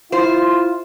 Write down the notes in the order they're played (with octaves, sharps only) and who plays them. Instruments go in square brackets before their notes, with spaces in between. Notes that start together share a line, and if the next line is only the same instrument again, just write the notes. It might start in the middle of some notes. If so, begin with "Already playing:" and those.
[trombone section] E4 F4 [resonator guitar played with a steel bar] C5